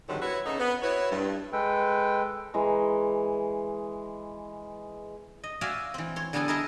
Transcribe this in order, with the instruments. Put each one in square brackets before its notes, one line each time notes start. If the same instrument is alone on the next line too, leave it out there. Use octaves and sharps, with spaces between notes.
[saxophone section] F2 G#2 D3 D#3 F#3 G3
E4 F#4 B4 C#5 E5
C#3 A3 D#4
B3
E4 F#4 B4 C#5
G2
[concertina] G#3 A4 B4 G5
[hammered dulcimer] E3 G#3 A#5
[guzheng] D#5
F#4 D5 E5 F5 G#5
E3 C4
C#5 C6
D3 G3 B3 A4 G#5 A5
G#4 A#4 D#5 E5 A5